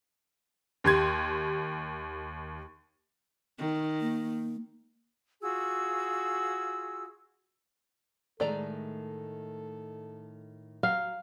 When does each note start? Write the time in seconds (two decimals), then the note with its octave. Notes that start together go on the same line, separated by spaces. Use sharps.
0.84 D#2 G4 C6 G#6
3.59 D#3
4.01 A#3
5.42 F4 F#4 G#4 E6
8.40 A2 D#3 G#3 A3 A4 D5 A#5
10.83 F#3 F5